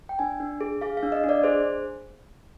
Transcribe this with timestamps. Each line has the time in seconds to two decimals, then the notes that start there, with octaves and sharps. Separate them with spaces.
0.09 G5
0.19 D4 G#5
0.40 D4
0.61 G#4
0.81 G#4 F5
0.97 F5
1.03 D4
1.12 D#5
1.24 D4
1.29 D5
1.44 G#4 C5